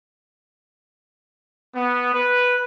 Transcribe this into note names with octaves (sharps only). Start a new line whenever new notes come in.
B3
B4